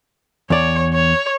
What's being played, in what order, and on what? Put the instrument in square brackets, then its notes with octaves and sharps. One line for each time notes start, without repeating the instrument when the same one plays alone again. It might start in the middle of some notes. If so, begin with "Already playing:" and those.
[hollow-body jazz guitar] E2 D5 [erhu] C#5
[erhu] C#5